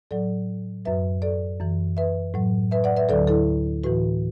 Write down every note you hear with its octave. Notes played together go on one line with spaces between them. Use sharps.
A2 F#3 A4 D5
F#2 F#3 B4 E5
A4 D5
F#2 E3
B4 E5
A2 F#3
B4 E5
D5 F#5
B4 E5
D2 D3 F#3 A4 D5
E4 A4
A2 E3 F#4 B4